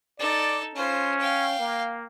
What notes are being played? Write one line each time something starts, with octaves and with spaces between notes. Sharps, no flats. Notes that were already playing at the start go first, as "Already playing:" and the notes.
D#4 A4 D5
C#4 F4 C5
F5 G5
A#3